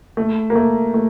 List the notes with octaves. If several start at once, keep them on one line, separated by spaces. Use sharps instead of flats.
A3
A#3
A3
A3